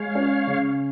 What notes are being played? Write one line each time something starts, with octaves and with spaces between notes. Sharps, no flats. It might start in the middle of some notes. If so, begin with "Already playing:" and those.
Already playing: G#3 C#5 F5
C#4
C#3